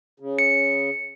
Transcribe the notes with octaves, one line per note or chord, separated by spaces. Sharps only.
C#3
C#7